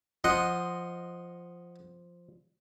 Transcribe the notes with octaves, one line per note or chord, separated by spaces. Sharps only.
F3 D#5 F#5 C6